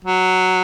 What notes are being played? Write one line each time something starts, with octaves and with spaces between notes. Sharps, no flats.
F#3